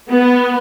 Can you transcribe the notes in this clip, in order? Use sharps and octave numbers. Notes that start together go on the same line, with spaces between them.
B3